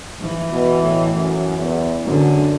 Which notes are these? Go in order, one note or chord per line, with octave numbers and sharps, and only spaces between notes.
E3
B2
A2
F#2
E2
F#2 D3